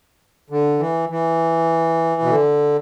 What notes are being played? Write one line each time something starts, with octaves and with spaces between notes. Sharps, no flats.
D3
E3
E3
B2
D3